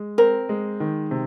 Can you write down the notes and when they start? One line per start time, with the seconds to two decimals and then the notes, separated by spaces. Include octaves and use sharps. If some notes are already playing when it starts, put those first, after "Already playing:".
Already playing: G#3
0.18 C4 A#4
0.49 G#3
0.80 D#3
1.11 C3